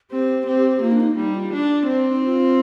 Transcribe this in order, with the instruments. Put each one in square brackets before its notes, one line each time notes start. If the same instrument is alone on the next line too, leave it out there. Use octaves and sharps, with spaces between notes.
[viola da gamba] C4 [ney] G4
[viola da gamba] C4
[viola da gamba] A#3 [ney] F4
[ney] D4
D#4
[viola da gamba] G3 [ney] D#4
[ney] F4
[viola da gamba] D4
C4
[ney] D4
D#4
F4